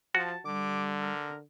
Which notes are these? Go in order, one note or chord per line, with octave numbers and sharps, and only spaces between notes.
F3 F#4 A5
D3 G3 D6
A#4